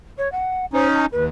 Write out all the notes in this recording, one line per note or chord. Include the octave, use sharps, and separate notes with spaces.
C#5
F#5
C#4 D#4 C5
A#5
D#2 B4